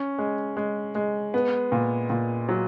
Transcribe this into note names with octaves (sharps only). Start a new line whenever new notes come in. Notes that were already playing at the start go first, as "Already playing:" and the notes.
Already playing: C#4
G#3
G#3
G#3
B3
A#2
A#2
F#3